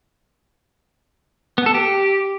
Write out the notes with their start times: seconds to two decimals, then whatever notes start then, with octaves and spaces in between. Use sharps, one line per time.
1.58 B3
1.66 A4
1.74 G4